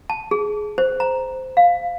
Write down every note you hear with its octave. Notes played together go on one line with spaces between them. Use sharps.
A5
G#4
C5
A#5
F5